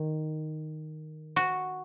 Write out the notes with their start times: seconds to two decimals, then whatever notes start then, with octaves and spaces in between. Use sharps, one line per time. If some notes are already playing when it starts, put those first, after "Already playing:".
Already playing: D#3
1.36 F#4